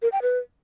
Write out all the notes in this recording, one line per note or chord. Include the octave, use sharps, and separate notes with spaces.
A#4
G5
B4